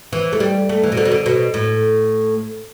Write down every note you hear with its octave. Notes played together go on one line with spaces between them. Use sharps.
E3
A3
G3
A3
E3
B2
D3
B2
D3
B2
A2